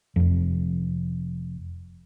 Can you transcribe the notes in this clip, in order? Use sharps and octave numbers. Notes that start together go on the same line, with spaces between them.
F1 F2